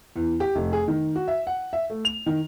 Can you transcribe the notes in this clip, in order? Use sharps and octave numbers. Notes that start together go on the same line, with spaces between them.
E2
G4
F1
G#4
D#3
F#4
E5
F#5
E5
A3
F7
D#3